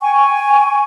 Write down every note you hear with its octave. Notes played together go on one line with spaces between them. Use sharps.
G5 G#5 C#6